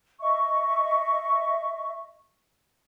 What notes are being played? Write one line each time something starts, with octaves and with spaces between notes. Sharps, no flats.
D#5 E5 C#6